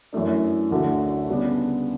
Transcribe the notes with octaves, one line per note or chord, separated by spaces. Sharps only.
F#2 E3 A3 D4
D2 D3 A3 D4 F#4
C#3 G3 B3 D4